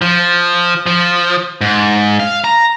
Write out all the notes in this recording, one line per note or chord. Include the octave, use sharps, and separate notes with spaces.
F3
F3
G#2
F5
A#5